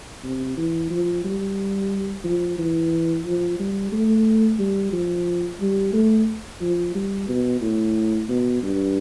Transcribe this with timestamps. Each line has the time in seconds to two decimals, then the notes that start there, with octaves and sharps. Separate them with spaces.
0.24 C3
0.57 E3
0.91 F3
1.24 G3
2.24 F3
2.58 E3
3.25 F3
3.59 G3
3.92 A3
4.59 G3
4.92 F3
5.61 G3
5.93 A3
6.61 F3
6.95 G3
7.28 B2
7.61 A2
8.29 B2
8.63 G2